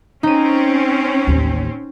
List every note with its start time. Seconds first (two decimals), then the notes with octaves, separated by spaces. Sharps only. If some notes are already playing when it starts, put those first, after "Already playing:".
0.23 C4 C#4 D#4 D#7
1.27 A1 D#2